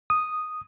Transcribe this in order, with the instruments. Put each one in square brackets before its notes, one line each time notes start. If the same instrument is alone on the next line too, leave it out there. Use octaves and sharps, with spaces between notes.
[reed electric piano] D#6